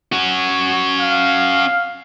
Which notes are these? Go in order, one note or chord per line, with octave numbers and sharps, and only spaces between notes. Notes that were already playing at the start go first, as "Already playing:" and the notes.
C#4 F#4
F5